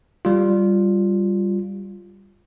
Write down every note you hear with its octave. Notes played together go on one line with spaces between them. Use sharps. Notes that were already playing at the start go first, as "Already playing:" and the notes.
G3 F4